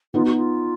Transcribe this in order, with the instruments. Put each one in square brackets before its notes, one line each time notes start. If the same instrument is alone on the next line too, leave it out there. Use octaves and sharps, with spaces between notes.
[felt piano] B3 D#4 [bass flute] F4
[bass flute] F#4
F4